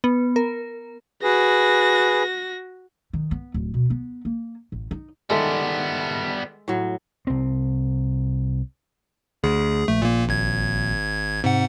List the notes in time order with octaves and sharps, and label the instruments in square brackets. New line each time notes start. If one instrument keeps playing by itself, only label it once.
[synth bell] B3
A#4
[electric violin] F#4 A#6 [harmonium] G#4 B4
[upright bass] D#3
B3
D1
B2
B3
A#3
A1
D#4
[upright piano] D#3 A4 E5 [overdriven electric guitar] G3 B3 [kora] G#3
[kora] A2 F#3
[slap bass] C2 C4
[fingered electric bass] D2 [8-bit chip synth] G#4
[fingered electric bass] A#1 [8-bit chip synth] A3
[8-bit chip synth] A#2 A#3
G#1 G#6
[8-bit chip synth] G#2 F#5 [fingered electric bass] C3